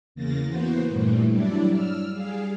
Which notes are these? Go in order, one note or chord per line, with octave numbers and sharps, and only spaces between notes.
E2 C#3 A#3 A6 A#6
E3 A#3 B3 F#4 C5
G2 A#2 E3 G3 A3
F#3 G3 D4 E4 D5
E6 F6
G3 G#4 F5